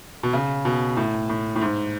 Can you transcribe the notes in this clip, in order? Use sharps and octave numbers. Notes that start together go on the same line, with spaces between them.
B2
C#3
B2
A2
A2
A2
G#2